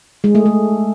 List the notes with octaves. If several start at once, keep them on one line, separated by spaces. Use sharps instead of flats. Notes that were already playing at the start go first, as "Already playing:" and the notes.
G#3
A3
A3